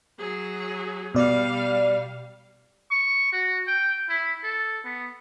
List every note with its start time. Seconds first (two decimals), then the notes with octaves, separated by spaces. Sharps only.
0.19 F#3 G#4
1.15 B2 G3 D5 F5
2.91 C#6
3.33 F#4
3.68 G5
4.09 E4
4.43 A4
4.85 B3